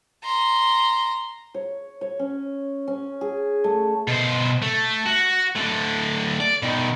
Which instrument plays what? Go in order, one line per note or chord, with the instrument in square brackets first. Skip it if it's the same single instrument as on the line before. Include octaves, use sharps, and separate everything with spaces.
[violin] A#5 C6
[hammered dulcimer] C#5
C#5
C#4
C#4
G#4
A3
[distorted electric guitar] B2 C5
A3
F#4
A2 D3
D5
B2 D#3